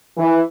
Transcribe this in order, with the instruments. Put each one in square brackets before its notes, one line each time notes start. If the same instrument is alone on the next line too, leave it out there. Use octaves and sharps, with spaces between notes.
[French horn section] E3